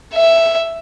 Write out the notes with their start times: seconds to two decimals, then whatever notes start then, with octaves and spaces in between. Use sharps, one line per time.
0.14 E5